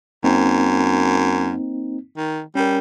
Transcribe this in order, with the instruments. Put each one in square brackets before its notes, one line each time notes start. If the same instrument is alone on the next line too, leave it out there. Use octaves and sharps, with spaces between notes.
[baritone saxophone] F#2 [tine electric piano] A#3 C4 D#4
[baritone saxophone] D#3
[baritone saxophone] G3 [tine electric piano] C#4 A#4